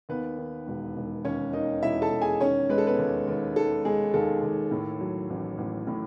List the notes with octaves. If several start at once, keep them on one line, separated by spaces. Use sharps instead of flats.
D#2 B3 B4
D#3
E1
E1
D#2 C#4 C#5
D#3 D#4 D#5
E1 E4 E5
A4 A5
E1
G#4 G#5
D#3 C#4 C#5
G#3 B4
A4
B3 B4
D#2
D#2
D#3 A4
G#3 G#4
D#2 A4
D#2
A2
F#3
A1
A1
A2